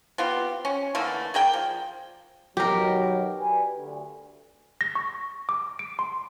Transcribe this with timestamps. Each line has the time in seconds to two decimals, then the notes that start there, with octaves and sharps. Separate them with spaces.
0.18 B3 C4 F4 G4
0.65 C#4
0.95 D3 E3 A3 A#3
1.34 G#4 A#4 D5 G5
1.54 F3
2.57 B2 D#3 F#3 G4 A#4
3.40 B4 D5 G#5
3.76 D2
4.81 A#6
4.95 C#6
5.49 D6
5.79 D7
5.99 C6